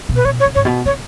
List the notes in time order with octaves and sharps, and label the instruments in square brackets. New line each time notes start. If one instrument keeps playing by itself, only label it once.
[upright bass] B2
[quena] B4
[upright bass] B2 [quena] C#5
[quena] C#5
[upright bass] C#3
[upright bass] G#2 [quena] C#5
[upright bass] B2
[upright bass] C#3 [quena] C#5